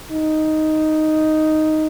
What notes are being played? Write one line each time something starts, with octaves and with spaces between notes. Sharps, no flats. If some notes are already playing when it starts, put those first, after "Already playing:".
D#4